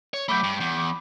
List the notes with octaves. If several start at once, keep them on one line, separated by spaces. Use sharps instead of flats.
C#5
F#3 A3 B5 D6 G6
G2
E2